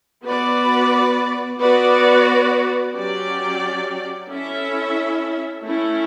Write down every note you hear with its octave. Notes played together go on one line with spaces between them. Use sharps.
B3 F#4 B4 D5
B3 F#4 B4 D5
F#3 C#4 G4 D5
C#4 E4 A4 E5
A3 C#4 E4